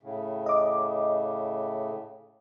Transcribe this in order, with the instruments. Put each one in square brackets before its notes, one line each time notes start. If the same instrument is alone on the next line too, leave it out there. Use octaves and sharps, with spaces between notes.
[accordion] A2 C#3
[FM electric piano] D#5 D6